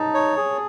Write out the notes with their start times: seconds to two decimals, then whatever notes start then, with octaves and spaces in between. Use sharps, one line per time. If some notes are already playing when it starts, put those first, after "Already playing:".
Already playing: D#4 A5
0.14 C#5
0.37 G#4